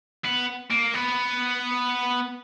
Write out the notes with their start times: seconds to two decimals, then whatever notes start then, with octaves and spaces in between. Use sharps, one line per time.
0.25 B3
0.71 A#3
0.94 B3